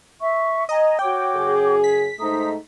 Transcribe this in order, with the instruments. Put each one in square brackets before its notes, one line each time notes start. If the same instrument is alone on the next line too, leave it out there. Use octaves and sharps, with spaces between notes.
[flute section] E5 C#6
[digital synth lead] D#5 [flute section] G#5 A#5
[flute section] F#4 C#5 D6 [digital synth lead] G5
[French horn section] F#2 C#3 G#4
[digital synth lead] B6
[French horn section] G#2 A3 D#4 [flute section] C5 A#5 D#6